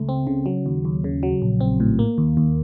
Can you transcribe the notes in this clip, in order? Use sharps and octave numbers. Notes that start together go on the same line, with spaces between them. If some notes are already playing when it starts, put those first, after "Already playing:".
Already playing: C#2 A3
C4
C#3
F#3
D#2
D#2
C#3
F#3
A#1
C4
A2
A#3
D#2
D#2